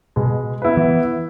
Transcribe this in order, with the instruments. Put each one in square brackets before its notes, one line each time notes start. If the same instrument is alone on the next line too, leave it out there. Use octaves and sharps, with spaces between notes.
[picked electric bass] B2 [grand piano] G#3
[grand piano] B3 E4 B4
[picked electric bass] E3